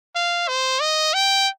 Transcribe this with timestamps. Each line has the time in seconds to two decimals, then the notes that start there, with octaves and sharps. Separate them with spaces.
0.15 F5
0.48 C5
0.81 D#5
1.14 G5